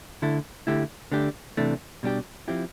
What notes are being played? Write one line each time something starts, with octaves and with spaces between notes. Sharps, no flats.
D3 A3 E4 A4
D3 A3 E4 G4
D3 A3 D4 G4
C3 E3 A3 D4
B2 G3 D4 G4
F3 C4 E4 G4